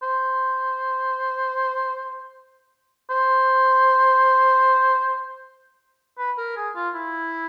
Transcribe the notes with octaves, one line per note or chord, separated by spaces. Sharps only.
C5
C5
B4
A#4
G#4
F4
E4